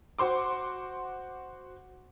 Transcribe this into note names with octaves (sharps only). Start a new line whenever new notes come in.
F#4 C5 C6 D6